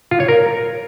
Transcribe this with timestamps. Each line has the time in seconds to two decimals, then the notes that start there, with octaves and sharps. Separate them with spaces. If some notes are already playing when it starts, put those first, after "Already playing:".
0.11 F4
0.20 C#5
0.28 A#4